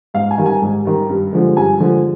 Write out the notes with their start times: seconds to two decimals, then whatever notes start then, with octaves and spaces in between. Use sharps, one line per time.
0.14 G#2 F5
0.31 G#5
0.38 D#3 G3
0.46 G#5
0.62 G#2
0.85 D#3 G3
1.09 G2
1.33 D3 F3 G#3
1.57 G2 G#5
1.80 D3 F3 G#3